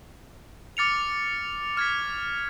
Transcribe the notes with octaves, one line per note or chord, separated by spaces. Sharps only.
D6 F6 A6 C#7 F7
C#6 F6 G#6 B6